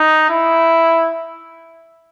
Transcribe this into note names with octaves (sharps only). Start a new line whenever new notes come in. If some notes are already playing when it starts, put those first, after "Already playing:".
Already playing: D#4
E4